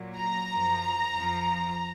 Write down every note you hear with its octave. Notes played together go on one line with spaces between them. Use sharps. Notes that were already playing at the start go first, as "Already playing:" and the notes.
Already playing: A#2 F#3
A#5
F#2 F3
F2 F3